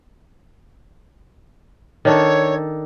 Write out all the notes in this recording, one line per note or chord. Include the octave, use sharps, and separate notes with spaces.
D#3 D4 A4 C#5